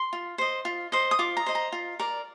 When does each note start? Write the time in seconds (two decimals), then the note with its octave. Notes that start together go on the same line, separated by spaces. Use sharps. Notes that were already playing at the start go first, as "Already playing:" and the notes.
Already playing: C6
0.13 F4
0.38 C5 D#5
0.65 F4
0.92 C5 D#5
1.11 D#6
1.19 F4 D6
1.37 A#5
1.46 C5 D#5
1.55 A#5
1.72 F4
2.00 A#4 D5